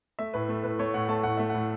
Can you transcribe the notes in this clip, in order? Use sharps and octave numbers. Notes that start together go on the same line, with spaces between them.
A3 E5
A2 B4
A3
A2 B4
A3 C#5
A2 F#5
A3 A5
A2 F#5
A3 E5
A2 F#5